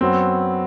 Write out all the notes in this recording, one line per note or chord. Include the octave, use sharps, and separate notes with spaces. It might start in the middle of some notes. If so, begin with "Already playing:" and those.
F#2 F#3 B3 C4